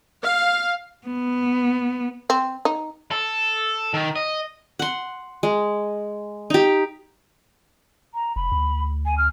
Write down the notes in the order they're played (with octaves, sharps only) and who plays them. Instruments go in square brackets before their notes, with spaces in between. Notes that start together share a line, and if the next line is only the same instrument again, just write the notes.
[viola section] F5
[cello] B3
[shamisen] C4
D#4
[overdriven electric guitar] A4
D#3
D#5
[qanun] F#5 C6
G#3
D#4 G4
[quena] A#5
[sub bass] F1 [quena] B5
[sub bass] D2
[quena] G#5
F6